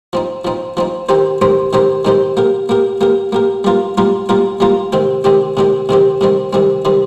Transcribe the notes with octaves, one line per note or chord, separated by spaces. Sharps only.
F3 C4 D#4
F3 C4 D#4
F3 C4 D#4
D#3 C4 D#4 G4 C5
D#3 C4 D#4 G4 C5
D#3 C4 D#4 G4 C5
D#3 C4 D#4 G4 C5
A#3 G4 A#4
A#3 G4 A#4
A#3 G4 A#4
A#3 G4 A#4
G3 A#3 F4 A#4
G3 A#3 F4 A#4
G3 A#3 F4 A#4
G3 A#3 F4 A#4
C3 D#3 C4 G4
C3 D#3 C4 G4
C3 D#3 C4 G4
C3 D#3 C4 G4
C3 D#3 G3 C4
C3 D#3 G3 C4
C3 D#3 G3 C4